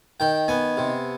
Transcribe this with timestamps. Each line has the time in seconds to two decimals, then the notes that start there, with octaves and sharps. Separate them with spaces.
0.20 D#3 G5
0.48 B3 G#5
0.77 C3